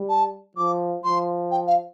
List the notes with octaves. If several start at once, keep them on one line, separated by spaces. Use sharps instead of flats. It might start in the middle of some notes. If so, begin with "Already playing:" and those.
Already playing: G3
A5
F3 D6
F3 C6
G5
F5